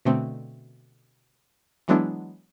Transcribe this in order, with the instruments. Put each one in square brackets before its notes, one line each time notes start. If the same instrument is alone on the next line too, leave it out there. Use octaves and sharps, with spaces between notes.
[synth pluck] B2 D3 A3 C4
E3 F#3 G#3 B3 D4 E4